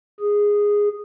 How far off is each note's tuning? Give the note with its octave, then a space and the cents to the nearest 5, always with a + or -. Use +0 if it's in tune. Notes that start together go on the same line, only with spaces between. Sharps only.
G#4 -10